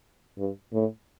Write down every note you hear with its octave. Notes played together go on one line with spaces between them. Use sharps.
G2
A2